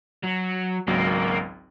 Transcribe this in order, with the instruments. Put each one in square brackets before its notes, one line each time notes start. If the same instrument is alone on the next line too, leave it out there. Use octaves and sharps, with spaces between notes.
[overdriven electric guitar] F#3
[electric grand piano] G#1 C#2 F#3 [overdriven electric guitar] A#3